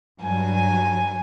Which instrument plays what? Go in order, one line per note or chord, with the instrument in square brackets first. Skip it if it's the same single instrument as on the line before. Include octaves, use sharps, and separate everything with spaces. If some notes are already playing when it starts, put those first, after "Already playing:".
[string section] G2 F#3 [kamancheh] G#5